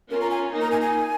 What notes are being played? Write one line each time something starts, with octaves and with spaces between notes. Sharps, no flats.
C#4 F4 A#4
A#5
G#5
A#3 D#4
A#5
G#5
G#5